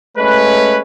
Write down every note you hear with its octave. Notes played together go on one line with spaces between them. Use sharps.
G#3 A3 C#4 B4